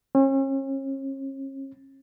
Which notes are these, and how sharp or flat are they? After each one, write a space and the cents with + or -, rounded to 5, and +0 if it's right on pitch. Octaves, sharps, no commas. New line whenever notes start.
C#4 -40